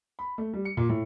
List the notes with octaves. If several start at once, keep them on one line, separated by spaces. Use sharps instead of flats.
B5
A3
G3
C#7
A#2
A2